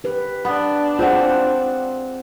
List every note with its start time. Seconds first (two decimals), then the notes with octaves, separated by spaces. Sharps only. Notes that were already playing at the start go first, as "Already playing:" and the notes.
0.04 G4 B4
0.45 B3 D4
0.99 C4 F4 G#4 F#5